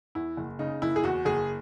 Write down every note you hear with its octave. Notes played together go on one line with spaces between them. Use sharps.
E2 E4
F#1
C#3 D#4
F#1 E4
G#4
E2 F#4
F#1 G#4